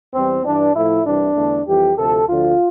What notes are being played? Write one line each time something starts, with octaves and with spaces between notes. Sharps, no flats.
E2 E3 G3 C4
G2 E3 G3 D4
A2 F3 A3 E4
C2 C3 E3 G3 D4
E2 D3 A3
F2 E3 G3 G4
D2 C3 F3 A4
D2 D3 F3 F4